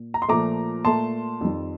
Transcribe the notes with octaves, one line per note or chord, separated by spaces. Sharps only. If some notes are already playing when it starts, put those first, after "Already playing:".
Already playing: A#2
A#5
C6
A#2 F3 A3 A#5 D6
A#2 A3 A5 C6
F2 D#3 G3